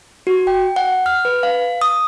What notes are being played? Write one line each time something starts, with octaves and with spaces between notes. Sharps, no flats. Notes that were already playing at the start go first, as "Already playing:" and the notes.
F#4
G5
F#5
F6
B4
F5
D#6